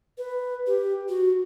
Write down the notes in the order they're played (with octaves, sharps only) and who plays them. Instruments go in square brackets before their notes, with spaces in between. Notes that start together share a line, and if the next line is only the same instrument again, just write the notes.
[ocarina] B4
G4
F#4